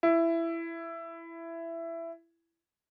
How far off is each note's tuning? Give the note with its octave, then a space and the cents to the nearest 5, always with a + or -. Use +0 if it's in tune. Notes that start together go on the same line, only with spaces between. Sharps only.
E4 +15